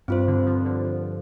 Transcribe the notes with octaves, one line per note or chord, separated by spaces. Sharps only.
G2 C4 F4 C5
D3
F3
D3
F3